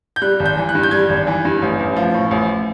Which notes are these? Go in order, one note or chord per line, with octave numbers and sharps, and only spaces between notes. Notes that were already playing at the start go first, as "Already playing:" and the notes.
G6
G3 F#6
G#1
G6
E3
F#6
G2
G6
G3 G#6
G#1
E3
G2
A1
A1
F3
A2
A1